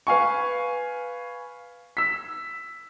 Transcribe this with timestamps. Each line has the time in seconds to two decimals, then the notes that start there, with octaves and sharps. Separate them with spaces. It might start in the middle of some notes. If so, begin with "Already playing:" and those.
0.07 B4 F5 G#5 C#6
1.97 E6 B6